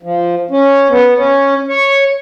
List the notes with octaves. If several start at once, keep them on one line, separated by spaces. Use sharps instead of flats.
F3
C#4
B3
C#4
C#5